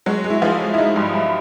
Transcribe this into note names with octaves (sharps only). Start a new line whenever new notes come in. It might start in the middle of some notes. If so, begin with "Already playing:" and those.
F#3 G#3 F#4
G#3
E4
F3 G#3 F4
G#3
E4
G#3 D#4
G2
G2